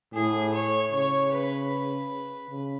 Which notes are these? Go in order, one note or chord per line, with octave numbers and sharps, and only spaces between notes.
A2 G#4
C#5
C#3 C#5
B4
C#3